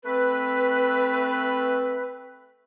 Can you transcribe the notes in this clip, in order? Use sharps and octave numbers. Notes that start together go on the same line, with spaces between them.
A3 C4 B4